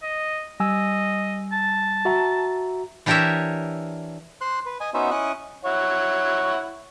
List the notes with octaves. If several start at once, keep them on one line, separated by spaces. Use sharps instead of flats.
D#5
G3 D#5 G#5 E6
A5
F#4 E5 A#5
E3 D4 G4 A#4 C#5 E5
C5 C6 F#6
B4
D#5 G#5
B3 C#4 D#4 F#4 C5 E5
C#4 E4 D#5 C#6 F#6
E4 C#5 F#5